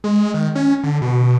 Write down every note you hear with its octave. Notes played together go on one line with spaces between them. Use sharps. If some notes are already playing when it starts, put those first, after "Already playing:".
G#3
D#3
C#4
D3
B2